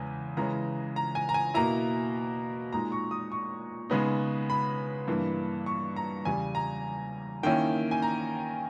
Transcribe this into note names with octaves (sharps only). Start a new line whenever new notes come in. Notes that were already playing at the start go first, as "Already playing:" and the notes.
Already playing: E2 C#3 G#3 G#5
C#3 E3 G#3 C#4 A#5
A#5
G#5
A#5
G#5
B2 A#3 E4 A#5
A#2 G#3 D#4 A#5
C#6
D#6
C#6
C#3 G#3 B3 D#4
B5
G2 E3 A#3
C#6
A#5
E2 C#3 G3 G#5
A#5
D#3 A#3 C#4 E4 G5
G#5
A#5